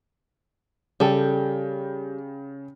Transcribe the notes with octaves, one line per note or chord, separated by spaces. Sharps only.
C#3 G3 A4 G5